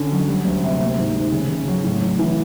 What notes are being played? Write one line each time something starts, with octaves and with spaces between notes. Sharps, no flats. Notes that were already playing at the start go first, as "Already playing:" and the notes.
Already playing: D3 C#4
F#3
G3
D2
C3
A#3
G#2
D#3
C#3
C#3
F#3
A2
A2
E3